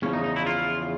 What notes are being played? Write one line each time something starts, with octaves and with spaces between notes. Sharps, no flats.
E2 C#3 F3 C#4
D#4
D#4
E4
F4